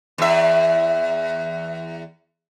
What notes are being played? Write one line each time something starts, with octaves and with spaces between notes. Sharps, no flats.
E2 E5